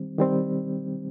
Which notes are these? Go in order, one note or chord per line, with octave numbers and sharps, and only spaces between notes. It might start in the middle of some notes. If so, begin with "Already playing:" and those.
Already playing: D#3 G3 C4
D#3 G3 C4